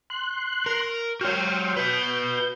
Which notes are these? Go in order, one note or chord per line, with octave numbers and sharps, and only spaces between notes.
C6 F#6
A#4
F#4 G4 C#5 G5 C6 F6
F#4 B4 G6